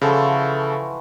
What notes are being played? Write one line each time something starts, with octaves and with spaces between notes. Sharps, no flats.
C#3 E3 F3 F#4 A4